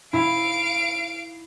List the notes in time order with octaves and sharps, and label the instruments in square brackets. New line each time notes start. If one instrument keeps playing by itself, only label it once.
[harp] E4 [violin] F5 D7